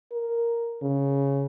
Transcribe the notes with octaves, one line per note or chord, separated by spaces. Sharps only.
A#4
C#3